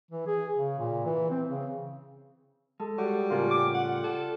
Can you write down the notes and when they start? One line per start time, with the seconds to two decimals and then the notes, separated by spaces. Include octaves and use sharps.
0.11 E3
0.27 G#4
0.55 C#3
0.79 A#2
1.05 E3
1.31 C4
1.48 C#3
2.80 G#3 A4
2.98 G3 F#4 A4 C#5
3.30 A2 C#3 A#3 F4 A4 G#5
3.51 G4 D5 D6
3.74 F#5
4.04 A4